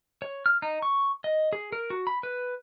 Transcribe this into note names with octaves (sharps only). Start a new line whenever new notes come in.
C#5
F6
D#4
C#6
D#5
G#4
A#4
F#4
B5
B4